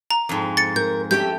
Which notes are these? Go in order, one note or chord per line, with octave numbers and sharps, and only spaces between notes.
A#5
F2 G#2
A6 C#7
A#4 G6
A3 C#4 G4 E5 G5 G6